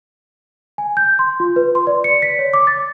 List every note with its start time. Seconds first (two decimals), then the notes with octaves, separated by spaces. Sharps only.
0.78 G#5
0.97 G6
1.19 C6
1.40 F4
1.56 B4
1.75 C6
1.87 D5
2.04 C#7
2.22 B6
2.39 C#5
2.53 D6
2.67 A6